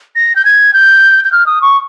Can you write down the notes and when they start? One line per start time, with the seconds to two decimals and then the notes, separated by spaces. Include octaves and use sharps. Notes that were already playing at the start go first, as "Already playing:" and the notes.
0.16 A#6
0.36 G6
0.45 G#6
0.73 G6
1.24 G6
1.32 F6
1.46 D#6
1.62 C#6